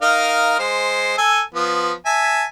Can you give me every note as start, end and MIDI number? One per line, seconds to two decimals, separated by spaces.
0.02 0.56 63
0.02 0.56 70
0.02 0.56 77
0.59 1.14 56
0.59 1.14 72
1.18 1.41 69
1.18 1.41 80
1.18 1.41 88
1.55 1.92 53
1.55 1.92 59
2.06 2.44 76
2.06 2.44 80
2.06 2.44 81